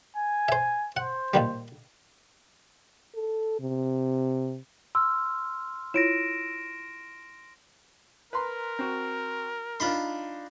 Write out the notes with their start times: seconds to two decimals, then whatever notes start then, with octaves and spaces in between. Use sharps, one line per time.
0.16 G#5
0.48 C5 E5
0.97 C5 F#5
1.34 A#2 D#3 G3
3.15 A4
3.60 C3
4.95 C6 E6 F6
5.94 E4 F4 C#5 A#6 D7 E7
8.33 A#4 B4 A#5 C6
8.79 C4 F#4
9.80 D4 D#4 F4 B5 C6